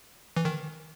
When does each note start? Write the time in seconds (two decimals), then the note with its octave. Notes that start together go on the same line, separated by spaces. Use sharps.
0.37 E3
0.45 D#3